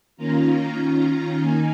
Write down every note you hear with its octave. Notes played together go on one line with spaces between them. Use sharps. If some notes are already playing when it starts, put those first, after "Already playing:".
D#3 A#3 C#4 F4 A#5
D#3 C#4 F4 A#5
D#3 A#3 D#4 G#5